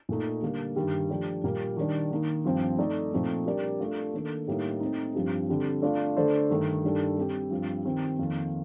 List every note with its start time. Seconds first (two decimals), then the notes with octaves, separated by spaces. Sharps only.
0.09 A#2 A3 D#4
0.42 D3 G3 A#3
0.76 G2 D#3 G3
1.10 F3 A3 D4 G4
1.44 A#2 G3 A#3
1.77 D#3 G3 D4
2.11 D#3 A#3 D#4
2.45 G2 F3 C4
2.78 A3 D#4 A4 D5
3.12 A#2 F3 A3 C4 D#4
3.46 G3 D4 G4 A#4 D5
3.80 A3 D4 F4 A4
4.14 D#3 A#3 D4 A4
4.47 A2 G3 A#3 D#4
4.81 A3 C4 D#4
5.15 G2 F3 C4 G4
5.48 D3 G3 C4
5.82 A3 D4 F4
6.16 D3 A3 D4 A4 C5
6.50 G2 D#3 A3
6.84 G2 D#3 G3 D4 A4
7.18 G3 C4 G4
7.51 G2 F3 C4 F4
7.84 D#3 G3 C4
8.19 F2 D#3 A#3 F4